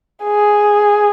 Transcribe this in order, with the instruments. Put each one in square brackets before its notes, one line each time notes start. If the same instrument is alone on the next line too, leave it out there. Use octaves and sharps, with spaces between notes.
[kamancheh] G#4